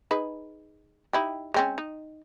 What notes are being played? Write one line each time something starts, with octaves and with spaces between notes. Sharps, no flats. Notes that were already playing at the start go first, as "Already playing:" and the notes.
D#4 G#4 B4
D#4 E4 G4
G#3 C4 C#4
D#4